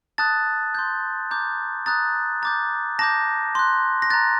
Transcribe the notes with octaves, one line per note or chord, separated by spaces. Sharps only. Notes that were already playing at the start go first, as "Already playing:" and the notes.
A5 D#6 F#6 A6
C6 G6
A#5 D6 G6
A#5 D#6 F#6 A6
A#5 D6 G6 A6
A5 D6 G6 A#6
C6 F#6
A#6
A#5 F#6 A6